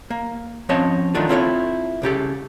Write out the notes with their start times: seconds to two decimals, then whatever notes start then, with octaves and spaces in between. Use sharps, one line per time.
0.10 A#3
0.69 F3 C4 C#4 C#5 D#5 A5
1.15 D#3 F#3 A3 D4 F4
1.29 C4 E4 F4 A4 C5 C#5
2.02 C2 C#3 G4 A4